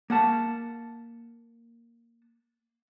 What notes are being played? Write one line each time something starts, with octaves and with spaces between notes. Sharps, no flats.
A#3 F#5 A5